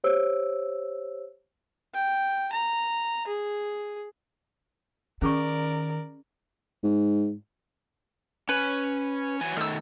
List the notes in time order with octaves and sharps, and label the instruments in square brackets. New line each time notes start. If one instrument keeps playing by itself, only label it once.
[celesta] G4 C5 C#5 E6
[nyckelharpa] G5
A#5
G#4
[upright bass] D#3 [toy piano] C#4 G#4 C#6 [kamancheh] A#4 D5
[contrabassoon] G#2
[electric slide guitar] C#4 [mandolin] B4
[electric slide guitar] E3 F#3 G#5
[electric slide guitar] D#3 A3 [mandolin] E6 F6